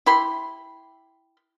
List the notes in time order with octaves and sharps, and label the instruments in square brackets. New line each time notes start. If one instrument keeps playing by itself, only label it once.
[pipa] E4 G4 B5 C6